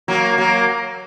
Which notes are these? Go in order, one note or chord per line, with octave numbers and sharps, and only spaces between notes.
F#3 A#3
F#3 A#3